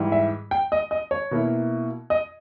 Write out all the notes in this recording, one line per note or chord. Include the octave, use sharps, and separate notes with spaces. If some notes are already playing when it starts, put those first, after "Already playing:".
Already playing: G#2 E3 G3
E5
G5
D#5
D#5
C#5
B2 A#3 E4
D#5